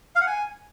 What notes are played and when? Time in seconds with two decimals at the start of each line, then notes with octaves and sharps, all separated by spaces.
0.15 F5
0.21 F#5
0.27 G#5